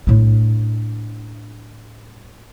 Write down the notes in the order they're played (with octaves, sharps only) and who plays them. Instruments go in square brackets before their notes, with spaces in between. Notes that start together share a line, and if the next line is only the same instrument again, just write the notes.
[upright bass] A2 D4